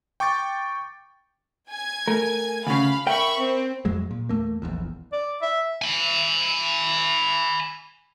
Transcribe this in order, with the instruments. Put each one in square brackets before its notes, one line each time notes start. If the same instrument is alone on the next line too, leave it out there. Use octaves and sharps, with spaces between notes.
[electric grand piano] G5 C#6 D6 A6
[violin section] G#5 G#6
[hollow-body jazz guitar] A3 A#4
[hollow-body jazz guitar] D2 C#3 [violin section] F5 B5
[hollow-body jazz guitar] A#4 G5 [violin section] E5 B5 C#6
[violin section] C4
[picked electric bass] F2 A2 F#3 G#3
A#2
E2 A3 A#3
D#1 A#1 E2
[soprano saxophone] D5
E5
[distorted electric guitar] G#5 B5